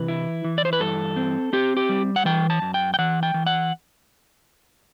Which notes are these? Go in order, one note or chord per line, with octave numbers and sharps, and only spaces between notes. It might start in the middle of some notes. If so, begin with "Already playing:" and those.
Already playing: C3 E3 B4
E4
E3
D5
C5
B4
G2 A4
C4
C4 G4
G4
G3
F#5
E3 G5
A5
F#2
G5
G5
E3 F#5
G5
E3
F#5